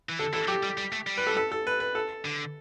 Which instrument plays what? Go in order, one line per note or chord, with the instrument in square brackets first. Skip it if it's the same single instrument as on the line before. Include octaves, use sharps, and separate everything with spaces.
[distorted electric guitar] E3
[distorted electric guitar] D3 [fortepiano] A4
[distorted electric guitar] E3 [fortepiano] A4
[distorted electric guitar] F#3 [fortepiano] G4
[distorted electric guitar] G3
G3
A3
G3
[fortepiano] B4
A4
A4
A4
B4
B4
A4
[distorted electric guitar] D3